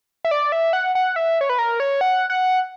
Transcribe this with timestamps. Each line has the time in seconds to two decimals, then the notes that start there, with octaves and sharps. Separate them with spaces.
0.25 E5
0.31 D5
0.52 E5
0.73 F#5
0.95 F#5
1.16 E5
1.41 C#5
1.49 B4
1.59 A#4
1.80 C#5
2.01 F#5
2.30 F#5